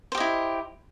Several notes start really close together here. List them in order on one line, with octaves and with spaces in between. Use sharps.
C5 G4 D#5 E4